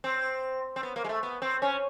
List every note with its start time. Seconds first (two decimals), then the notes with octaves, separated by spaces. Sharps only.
0.04 C4
0.76 C4
0.83 B3
0.96 A#3
1.04 G#3
1.09 A3
1.23 B3
1.42 C4
1.62 C#4